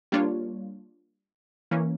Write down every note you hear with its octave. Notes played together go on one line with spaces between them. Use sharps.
G3 A#3 D4 F4 C#5
E3 A#3 C#4